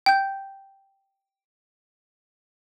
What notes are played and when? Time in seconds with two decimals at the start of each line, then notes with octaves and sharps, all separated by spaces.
0.06 G5 G6